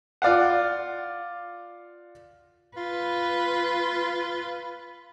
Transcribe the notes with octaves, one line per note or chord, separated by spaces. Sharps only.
F4 D5 F5 F#5
F4 B4